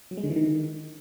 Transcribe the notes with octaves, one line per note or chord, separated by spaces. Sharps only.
F#3
G#3
D3
E3
D#3